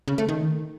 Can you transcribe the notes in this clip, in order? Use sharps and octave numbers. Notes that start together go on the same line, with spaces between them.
C#3
A3
D#3